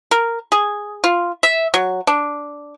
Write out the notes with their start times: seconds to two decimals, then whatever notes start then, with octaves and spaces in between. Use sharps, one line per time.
0.11 A#4
0.52 G#4
1.04 F4
1.43 E5
1.74 F#3
2.07 D4